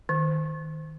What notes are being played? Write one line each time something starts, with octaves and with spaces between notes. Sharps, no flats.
D#3